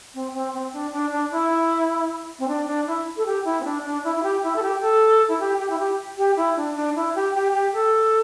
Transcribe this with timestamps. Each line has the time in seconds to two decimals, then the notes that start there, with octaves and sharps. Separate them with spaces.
0.14 C4
0.34 C4
0.54 C4
0.73 D4
0.93 D4
1.12 D4
1.32 E4
2.39 C4
2.48 D4
2.67 D4
2.87 E4
3.17 A4
3.26 G4
3.45 E4
3.60 C4
3.64 D4
3.84 D4
4.04 E4
4.16 E4
4.23 G4
4.43 E4
4.56 A4
4.62 G4
4.81 A4
5.28 E4
5.40 G4
5.60 G4
5.70 E4
5.79 G4
6.18 G4
6.37 E4
6.57 D4
6.76 D4
6.96 E4
7.15 G4
7.35 G4
7.54 G4
7.74 A4